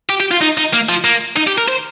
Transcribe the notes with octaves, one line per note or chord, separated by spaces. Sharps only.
G4
G4
F4
D#4
D#4
A#3
F3
A#3
D#4
G4
A#4
C5